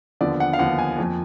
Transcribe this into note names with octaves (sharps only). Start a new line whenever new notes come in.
D#2 D3 F3 B3 D5
F#5
F5
D#2 D3 F3 B3 F#5
G#5
F2 F3 A#3